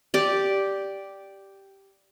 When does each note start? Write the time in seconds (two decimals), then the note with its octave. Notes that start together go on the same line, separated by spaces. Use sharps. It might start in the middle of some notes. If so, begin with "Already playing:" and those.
0.14 G4 D5